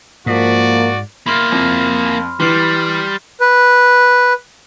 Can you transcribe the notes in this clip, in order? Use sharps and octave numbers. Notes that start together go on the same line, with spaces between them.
G#2 F3 A#3 F#4 D5
A#3 E4 B5 C6 F6
F2
E3 G3 C6 F6 C7
B4